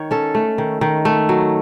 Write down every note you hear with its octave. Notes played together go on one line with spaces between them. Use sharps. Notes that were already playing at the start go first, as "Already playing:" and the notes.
Already playing: D#3 C#5
C#4 A4
A3
D#3
D#3
A3
F#3